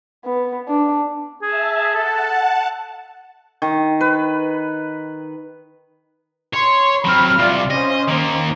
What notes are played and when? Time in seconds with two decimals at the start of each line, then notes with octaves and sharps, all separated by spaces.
0.25 B3
0.68 D4
1.42 G#4 E5 A5
1.95 A4 F#5 A5
3.62 D#3
4.01 B4
6.54 C#5 C6
7.05 F#3 C4 B5 F6
7.39 C2 C3 F4 D5
7.70 C#4 C5 D#5
8.08 D#3 A#3